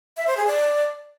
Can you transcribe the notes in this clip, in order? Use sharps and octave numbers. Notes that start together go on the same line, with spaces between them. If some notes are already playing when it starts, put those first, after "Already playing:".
E5
C5
G#4
D5